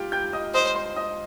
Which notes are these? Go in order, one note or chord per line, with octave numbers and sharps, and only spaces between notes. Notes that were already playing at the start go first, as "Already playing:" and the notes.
Already playing: F4 G4 G5
G5 G6
D#5 D#6
C5 D#5 D#6
C5 C6
D#5 D#6